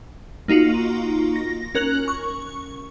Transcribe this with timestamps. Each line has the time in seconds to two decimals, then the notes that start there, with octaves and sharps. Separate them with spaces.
0.48 A#3 D#4 F4 F#4
1.36 A#6
1.75 C#4 A#4 F#6 F#7
2.08 C#6